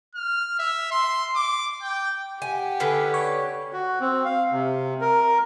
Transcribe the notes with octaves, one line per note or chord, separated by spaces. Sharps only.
F6
E5
C6
D6
G5
G4 F#5 G#5
D3 C#4 B4
C#5
F#4
C4
F5
C3
A#4